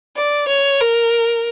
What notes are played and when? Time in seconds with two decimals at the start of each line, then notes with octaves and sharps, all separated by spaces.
0.16 D5
0.48 C#5
0.81 A#4